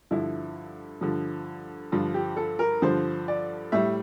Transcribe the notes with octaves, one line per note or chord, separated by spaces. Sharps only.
G2 D3 F3 E4
G2 D3 F3
G2 D3 F3 F4
G4
A4
A#4
G2 D3 F3 C5
D5
A2 G3 E5